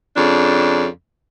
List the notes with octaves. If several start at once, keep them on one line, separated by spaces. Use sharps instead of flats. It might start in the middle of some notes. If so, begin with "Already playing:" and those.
F2 C#3 D4